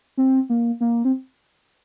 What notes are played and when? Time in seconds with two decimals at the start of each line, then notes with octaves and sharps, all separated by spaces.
0.17 C4
0.49 A#3
0.80 A#3
1.05 C4